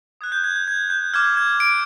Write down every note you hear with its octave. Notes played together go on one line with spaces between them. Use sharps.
D#6 F#6 G#6
G6
G#6
G6
G#6
G6
D6 F6 G#6
G#6
D7